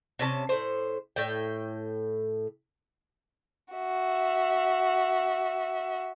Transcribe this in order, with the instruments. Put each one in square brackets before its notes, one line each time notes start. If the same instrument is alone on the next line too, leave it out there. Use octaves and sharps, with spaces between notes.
[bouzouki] C3 C#4 A5
A2 C5
A2 G5
[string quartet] F#4 E5